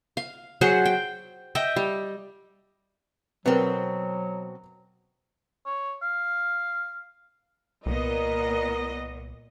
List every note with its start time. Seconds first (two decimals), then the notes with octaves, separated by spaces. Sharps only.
0.17 F5
0.61 F#3 G#4 C5 F#5
0.85 G5
1.55 D#5 E5 G5
1.76 G3
3.46 B2 F#3 B3 C4 A#4
5.66 C#5
6.02 F5
7.86 C2 A#2 B3 A#4 D#5